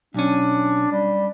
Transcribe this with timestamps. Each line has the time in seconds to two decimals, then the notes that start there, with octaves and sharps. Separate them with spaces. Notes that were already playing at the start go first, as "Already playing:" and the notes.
0.14 B1 C#4 D4
0.92 G3